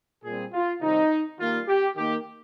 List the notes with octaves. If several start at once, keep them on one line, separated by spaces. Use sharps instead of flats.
A#2 G3 C4 G#4
F4
C3 D#3 G3 C4 D#4
D#3 G3 A#3 F4
G4
D#3 A#3 G4